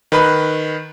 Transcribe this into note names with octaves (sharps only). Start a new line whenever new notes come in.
D#3 B4 B5 F#6